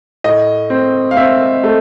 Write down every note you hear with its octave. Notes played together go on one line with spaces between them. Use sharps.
A2 D#5
C4
F5
C4 E5
A3